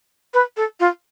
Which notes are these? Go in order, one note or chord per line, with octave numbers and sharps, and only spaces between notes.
B4
A4
F4